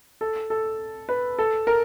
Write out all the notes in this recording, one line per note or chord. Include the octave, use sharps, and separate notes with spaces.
A4
A4
B4
A4
A#4